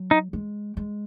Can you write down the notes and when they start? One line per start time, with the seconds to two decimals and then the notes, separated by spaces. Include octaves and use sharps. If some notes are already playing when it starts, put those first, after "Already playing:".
Already playing: F#3
0.11 D#4
0.33 G#3
0.77 G#3